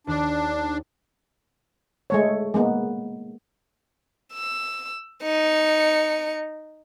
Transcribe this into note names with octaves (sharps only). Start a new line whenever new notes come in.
D#2 D4 D5
G#3 A3 C#5
G#3 A#3 B3
E6
D#4 C#7